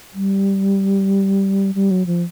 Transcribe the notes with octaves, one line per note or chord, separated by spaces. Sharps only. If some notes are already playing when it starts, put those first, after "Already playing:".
G3
G3
F#3
F3